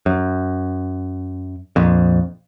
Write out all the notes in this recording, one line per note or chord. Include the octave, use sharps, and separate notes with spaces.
F#2
A#1 F2